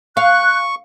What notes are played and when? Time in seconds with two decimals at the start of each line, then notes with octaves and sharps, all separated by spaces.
0.17 F5 C#6 F#6